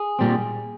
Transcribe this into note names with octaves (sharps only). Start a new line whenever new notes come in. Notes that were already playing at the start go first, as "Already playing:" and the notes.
Already playing: G#4
A#2 G3 C4